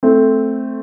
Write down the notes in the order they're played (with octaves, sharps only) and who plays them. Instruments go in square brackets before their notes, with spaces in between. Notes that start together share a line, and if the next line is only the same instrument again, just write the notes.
[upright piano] A3 C4